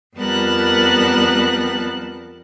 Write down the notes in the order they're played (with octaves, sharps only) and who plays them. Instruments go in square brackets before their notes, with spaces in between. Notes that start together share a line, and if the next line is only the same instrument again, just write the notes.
[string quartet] F2 G3 B3 A#4 A5 F#6